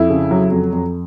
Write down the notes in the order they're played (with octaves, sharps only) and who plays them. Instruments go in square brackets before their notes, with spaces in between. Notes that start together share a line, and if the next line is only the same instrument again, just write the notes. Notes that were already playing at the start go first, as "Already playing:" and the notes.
Already playing: [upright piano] F2 E4
C#3
F#3
F2
F2